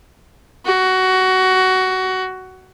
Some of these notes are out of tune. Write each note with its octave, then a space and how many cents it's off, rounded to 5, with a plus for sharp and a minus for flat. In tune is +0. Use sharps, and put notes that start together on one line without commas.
F#4 +15